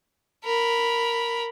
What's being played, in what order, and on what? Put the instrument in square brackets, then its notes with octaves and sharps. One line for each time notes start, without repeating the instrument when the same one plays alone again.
[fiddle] A#4 B5